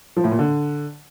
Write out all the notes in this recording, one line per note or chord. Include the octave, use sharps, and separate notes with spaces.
F3
A2
A#2
D3